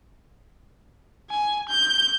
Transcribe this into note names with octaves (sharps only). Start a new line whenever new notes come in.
G#5
G6